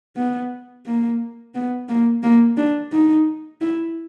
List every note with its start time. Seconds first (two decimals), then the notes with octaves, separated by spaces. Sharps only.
0.16 B3
0.86 A#3
1.54 B3
1.89 A#3
2.23 A#3
2.57 D4
2.92 D#4
3.61 E4